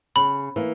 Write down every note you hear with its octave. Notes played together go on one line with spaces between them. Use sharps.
C#3 B5
E3 A#3